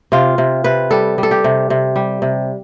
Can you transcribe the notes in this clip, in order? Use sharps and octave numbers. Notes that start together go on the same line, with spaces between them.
C3 F4
C3
C3 B4
G3 A4
G3
A4
G4
C3
C3
G3
C3